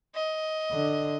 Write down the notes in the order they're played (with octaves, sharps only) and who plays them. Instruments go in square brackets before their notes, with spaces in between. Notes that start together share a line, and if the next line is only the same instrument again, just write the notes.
[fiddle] D#5
[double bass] D3